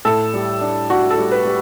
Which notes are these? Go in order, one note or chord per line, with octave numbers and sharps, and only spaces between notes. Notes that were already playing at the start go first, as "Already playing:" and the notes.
A2 A4
G3
D4
D4 F#4
A4
G3
B4
G3